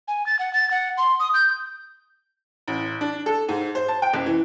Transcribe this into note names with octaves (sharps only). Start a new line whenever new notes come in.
G#5
A6
F#5
A6
F#5
C6
D#6
G6
A1
D4
A4
G#2
C5
A5
G5
F#1
E3